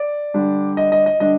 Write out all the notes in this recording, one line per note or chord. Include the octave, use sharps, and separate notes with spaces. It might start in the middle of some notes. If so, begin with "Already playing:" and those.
Already playing: D5
D3 G3 D4
D#5
D#5
D#5
D3 G3 D4 D#5